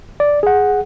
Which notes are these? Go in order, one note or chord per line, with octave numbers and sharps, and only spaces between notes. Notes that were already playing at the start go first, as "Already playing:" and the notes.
D5
G#4 F#5